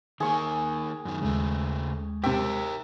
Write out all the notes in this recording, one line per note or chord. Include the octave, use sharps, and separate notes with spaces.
D#3 A#3 G#4 C#6
F#2 D#3
D#2 C#3 G#3 A3
C3 G4 A#4 E5 G5